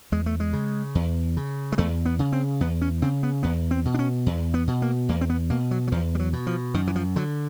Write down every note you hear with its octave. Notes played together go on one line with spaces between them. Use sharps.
E2 G#3
A3
G#3
C#3
E2
C#3
G#3
E2 A3
B3
C#3
C4
E2 B3
C#4
C#3 C4
B3
E2 B3
C4
B2
D4
C#4
E2
B3
B2
A#3
E2 A#3
C4
B3
B2 A#3
F#3
F#3
E2 F3
G3
F#3
B2
F3
F#2 D#3
E3
F3
D3 F#3